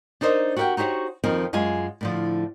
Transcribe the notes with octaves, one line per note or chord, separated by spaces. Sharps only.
D4 D#4 A#4 C5 D#5
F#4 G4 A#4 D5 F#5 G5
D#4 F#4 G4 C5 C#5
F2 D#3 F3 C4 D#4
F#2 G#3 F4 G#5
A2 D3 F3